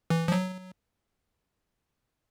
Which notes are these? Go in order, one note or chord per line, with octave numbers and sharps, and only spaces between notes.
E3
F3
F#3